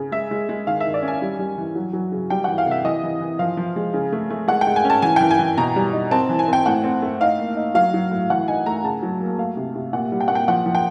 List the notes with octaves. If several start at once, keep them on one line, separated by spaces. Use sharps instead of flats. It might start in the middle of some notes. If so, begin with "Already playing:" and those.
Already playing: C#3
G#3 E5
G#3
G#3
D#3 F5
E5
D#3
D5
C#4
G#5
G3
G3
E3
F#3
F#3
C#3
G3 G5
E3 F#5
F5
C3
E5
E3 D#5
E3
E3
F3 F5
F3
G#3
C#3
A3
A3
G#3 F#5
G5
G#3
G#5
C#4 A5
E3 G#5
E3 G5
G#5
E3
B2 A#5
G3
D#4
C4 A5
E3
G#5
C4 G5
A2 F#5
C4
A3
D#4 F5
A#3
D#4
F#3 F5
F#3
A2
E3 F#5
D#4 G#5
A3 A#5
C#3 A5
F#3
A#3
A3 F5
C3
C3
A#2 F#5
G3
G5
A#2 F#5
G5
F3 F#5
F3
G5